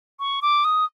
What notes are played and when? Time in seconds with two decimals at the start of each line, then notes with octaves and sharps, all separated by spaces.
0.20 C#6
0.42 D6
0.64 D#6